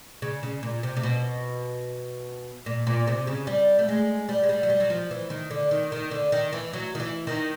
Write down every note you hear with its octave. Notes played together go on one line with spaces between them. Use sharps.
C#3
C#3
A#2
C3
C3
B2
A#2
A#2
C3
C#3
G3
A3
G#3
G3
G#3
G3
F#3
G3
F#3
F3
E3
D#3
D3
D#3
D#3
D3
D#3
E3
F#3
D#3
E3
D#3